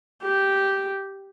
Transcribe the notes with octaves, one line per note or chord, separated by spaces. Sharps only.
G4